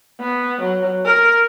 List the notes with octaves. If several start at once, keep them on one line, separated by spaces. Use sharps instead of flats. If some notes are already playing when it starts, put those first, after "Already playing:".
B3
F#3
A#4